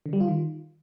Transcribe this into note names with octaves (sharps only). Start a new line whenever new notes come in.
D3
G3
F4
D#3